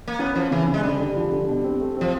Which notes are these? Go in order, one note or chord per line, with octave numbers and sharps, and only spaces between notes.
A#3
B3 C#4
F3 C#4
C#3 E3
C#3
G#3
D3 G3
D3
F3
D3
B2
C4
A3
F3 C4